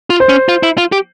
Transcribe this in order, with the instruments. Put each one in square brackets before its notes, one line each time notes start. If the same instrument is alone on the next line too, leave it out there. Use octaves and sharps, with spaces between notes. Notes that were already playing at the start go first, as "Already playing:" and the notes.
[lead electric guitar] F4
[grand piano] C5
[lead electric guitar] C#4
F4
E4
F4
G4